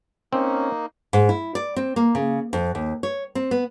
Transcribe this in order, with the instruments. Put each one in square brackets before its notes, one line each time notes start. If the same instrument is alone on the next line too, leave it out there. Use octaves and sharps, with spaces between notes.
[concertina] A#3 D#4 [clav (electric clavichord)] C4 [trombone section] C#4
[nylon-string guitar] G#2
E4
D5
C4
A#3
C#3
F2
D#2
C#5
C4
B3